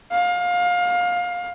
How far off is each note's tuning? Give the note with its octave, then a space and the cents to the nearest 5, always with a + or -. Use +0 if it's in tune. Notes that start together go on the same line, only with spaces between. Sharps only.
F5 +25